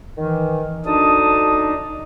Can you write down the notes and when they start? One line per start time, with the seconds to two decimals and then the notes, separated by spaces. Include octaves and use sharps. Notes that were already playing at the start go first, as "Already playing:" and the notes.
0.16 D#3 E3
0.86 D2 D4 D#4 A5 D#6